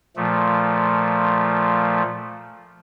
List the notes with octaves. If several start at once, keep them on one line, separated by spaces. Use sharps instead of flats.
A#2 F3 A3